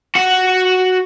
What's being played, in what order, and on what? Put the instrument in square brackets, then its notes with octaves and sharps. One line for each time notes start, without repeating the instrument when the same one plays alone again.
[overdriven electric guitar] F#4 F#5